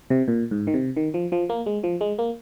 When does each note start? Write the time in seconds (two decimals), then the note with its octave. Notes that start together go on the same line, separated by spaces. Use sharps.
0.10 C3
0.28 A#2
0.51 G#2
0.67 D#3
0.74 C3
0.97 D#3
1.14 F3
1.32 F3
1.50 A#3
1.66 G#3
1.84 F3
2.01 G#3
2.19 A#3